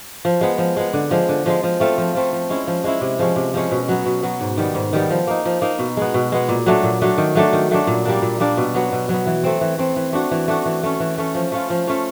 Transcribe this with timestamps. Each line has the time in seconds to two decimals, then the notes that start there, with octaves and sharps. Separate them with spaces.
0.25 F3
0.41 G#3 B3
0.58 F3
0.77 G#3 B3
0.93 D3
1.11 F3 G#3
1.29 D3
1.46 F3 G#3
1.63 F3
1.80 A3 C4 F4
1.98 F3
2.15 A3 C4 F4
2.33 F3
2.50 G#3 C#4 E4
2.67 F3
2.84 G#3 C#4 E4
3.01 C3
3.19 F3 G#3 C#4
3.36 C3
3.54 F3 G#3 C#4
3.71 B2
3.89 F#3 B3
4.06 B2
4.23 F#3 B3
4.41 G#2
4.57 D#3 G3 B3
4.75 G#2
4.93 D#3 G3 B3
5.10 F3
5.27 A#3 D#4
5.45 F3
5.62 A#3 D#4
5.79 B2
5.97 G#3 B3
6.14 B2
6.32 G#3 B3
6.49 A#2
6.66 F#3 A3 D4
6.83 A#2
7.02 F#3 A3 D4
7.18 D#3
7.35 F#3 A3 D4
7.53 D#3
7.71 F#3 A3 D4
7.87 A#2
8.05 G3 A#3 D4
8.22 A#2
8.40 G3 A#3 D4
8.57 B2
8.75 F#3 B3
8.92 B2
9.09 F#3 B3
9.26 E3
9.44 A3 C4
9.61 E3
9.78 A3 C4
9.96 E3
10.13 A3 D4 F#4
10.31 E3
10.48 A3 D4 F#4
10.65 E3
10.83 A3 C#4
11.00 E3
11.18 A3 C#4
11.35 F3
11.52 A3 C#4 F4
11.70 F3
11.87 A3 C#4 F4